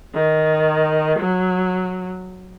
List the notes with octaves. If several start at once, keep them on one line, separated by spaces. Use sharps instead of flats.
D#3
F#3